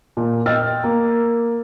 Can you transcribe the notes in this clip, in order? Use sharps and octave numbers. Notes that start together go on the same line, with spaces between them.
A#2
D#5 G5 E6 F6 A6
A#3